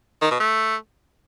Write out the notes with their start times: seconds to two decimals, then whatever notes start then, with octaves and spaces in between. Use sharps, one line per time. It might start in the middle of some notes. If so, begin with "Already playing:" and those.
0.22 D#3
0.31 B2
0.40 A3